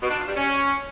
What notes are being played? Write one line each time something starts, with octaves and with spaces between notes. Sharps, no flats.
B2
D4
F4
G3
C#4